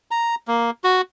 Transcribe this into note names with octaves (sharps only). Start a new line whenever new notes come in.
A#5
A#3
F#4